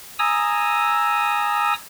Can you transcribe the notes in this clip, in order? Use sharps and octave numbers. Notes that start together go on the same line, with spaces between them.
G#5 A#5 D#6 E6